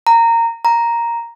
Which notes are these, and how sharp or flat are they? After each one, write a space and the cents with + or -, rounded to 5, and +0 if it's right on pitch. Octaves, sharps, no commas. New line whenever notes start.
A#5 -15
A#5 +0